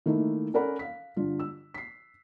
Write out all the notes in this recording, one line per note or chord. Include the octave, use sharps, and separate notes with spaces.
D#3 A3 A#3 D#4 E4
C#4 A4 A#4 D5 F#5 B5
F5 B6
G2 D3 F4
E6
B6 C7